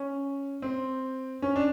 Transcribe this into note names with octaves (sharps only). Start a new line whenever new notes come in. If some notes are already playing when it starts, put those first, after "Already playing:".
Already playing: C#4
C4
C#4
D4